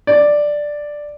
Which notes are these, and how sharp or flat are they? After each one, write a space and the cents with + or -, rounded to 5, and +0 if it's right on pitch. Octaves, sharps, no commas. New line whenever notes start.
D5 +5